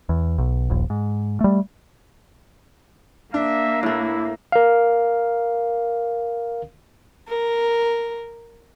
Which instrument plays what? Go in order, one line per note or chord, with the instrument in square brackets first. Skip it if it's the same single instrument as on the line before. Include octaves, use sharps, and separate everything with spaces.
[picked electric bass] E2
B1
D#1 A#1
G#2
G3 A3
[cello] A#3 [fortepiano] D4 [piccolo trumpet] E5
[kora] A2 A3 [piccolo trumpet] E4
[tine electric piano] A#4 F5
[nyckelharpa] A#4